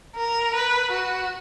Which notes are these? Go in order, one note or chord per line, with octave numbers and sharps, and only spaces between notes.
A#4
B4
F#4